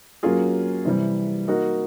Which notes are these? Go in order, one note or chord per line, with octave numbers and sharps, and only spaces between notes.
F#3 A#3 C#4 F4 G#4
C3 E3 G3
A#3 D#4 F#4 A#4